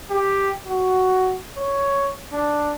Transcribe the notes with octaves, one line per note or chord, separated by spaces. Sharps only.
G4
F#4
C#5
D4